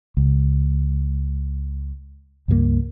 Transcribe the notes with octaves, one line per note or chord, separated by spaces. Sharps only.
C#2
C#2 G2 F3 A#3